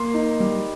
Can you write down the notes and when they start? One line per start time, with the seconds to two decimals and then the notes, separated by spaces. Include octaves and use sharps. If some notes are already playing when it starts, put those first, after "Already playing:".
Already playing: A#3 C6
0.14 D#4
0.40 G3